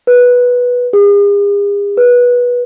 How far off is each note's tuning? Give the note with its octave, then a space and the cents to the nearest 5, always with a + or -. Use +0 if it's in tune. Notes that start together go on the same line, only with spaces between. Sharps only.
B4 -10
G#4 -45
B4 -20